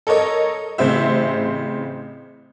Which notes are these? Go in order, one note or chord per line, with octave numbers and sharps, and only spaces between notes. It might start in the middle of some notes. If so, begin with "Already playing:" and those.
A4 A#4 C#5 D#5
A1 C#3 C4 C5 E5